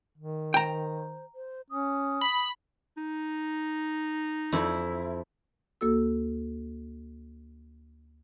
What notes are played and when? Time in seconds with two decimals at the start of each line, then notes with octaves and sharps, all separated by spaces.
0.18 D#3
0.54 C5 G5 A#5
1.35 C5
1.70 C#4 D#6
2.21 B5
2.97 D#4
4.52 F2 E4
5.81 D2 A#3 F#4 A4 E6